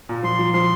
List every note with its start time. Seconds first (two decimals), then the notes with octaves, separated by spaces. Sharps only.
0.09 A#2
0.23 F3 C6
0.39 F3
0.53 F3 C6